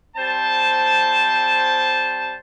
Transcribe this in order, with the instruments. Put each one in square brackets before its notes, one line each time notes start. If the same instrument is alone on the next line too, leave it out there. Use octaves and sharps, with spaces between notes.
[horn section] G3 C4 C5 A5